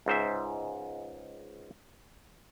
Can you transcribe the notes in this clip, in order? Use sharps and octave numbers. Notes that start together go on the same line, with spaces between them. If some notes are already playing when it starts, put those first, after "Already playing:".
C#2 G#2 C5 E5